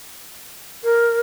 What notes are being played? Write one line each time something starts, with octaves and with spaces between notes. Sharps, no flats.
A#4